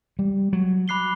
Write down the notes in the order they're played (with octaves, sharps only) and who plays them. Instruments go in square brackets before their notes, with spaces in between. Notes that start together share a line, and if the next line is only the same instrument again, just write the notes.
[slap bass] G3
F#3
[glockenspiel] B5 D6 F#6 C7 G7